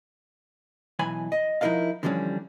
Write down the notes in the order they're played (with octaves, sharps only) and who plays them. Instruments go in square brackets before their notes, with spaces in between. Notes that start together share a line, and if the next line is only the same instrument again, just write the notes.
[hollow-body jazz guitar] B1 E3 G#5 B5
D#5
F3 D#4 E4 A#4 D#5 F5
D3 E3 F3 G3 C#4